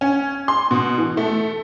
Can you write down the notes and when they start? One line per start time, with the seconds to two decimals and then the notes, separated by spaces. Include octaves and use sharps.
0.01 C#4
0.48 C6
0.71 B2
0.98 E3
1.17 A3